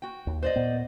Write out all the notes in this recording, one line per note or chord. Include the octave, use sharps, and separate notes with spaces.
F#4 G5
D#2
C5 D5 D#5
A#2 B3